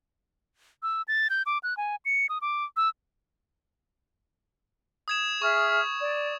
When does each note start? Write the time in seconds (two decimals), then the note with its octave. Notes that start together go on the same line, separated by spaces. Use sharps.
0.83 E6
1.08 A6
1.30 G6
1.46 D6
1.63 F#6
1.77 G#5
2.05 C#7
2.29 D#6
2.42 D6
2.77 E6
5.08 D#6 G#6 E7
5.42 G#4 E5 C#6 F6
6.00 D5